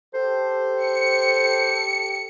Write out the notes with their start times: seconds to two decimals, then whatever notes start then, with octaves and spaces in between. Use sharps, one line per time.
0.14 G4 A4 C5
0.83 C#7